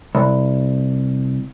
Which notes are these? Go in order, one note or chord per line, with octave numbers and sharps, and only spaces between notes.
C2